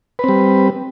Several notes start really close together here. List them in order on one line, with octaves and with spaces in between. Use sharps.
B4 C4 G3